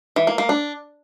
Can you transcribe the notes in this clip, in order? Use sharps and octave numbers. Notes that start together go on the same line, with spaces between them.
E3
A#3
A#3
D4